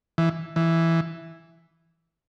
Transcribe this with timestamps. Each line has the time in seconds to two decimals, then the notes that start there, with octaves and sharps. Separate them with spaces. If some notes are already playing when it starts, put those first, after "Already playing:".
0.18 E3
0.56 E3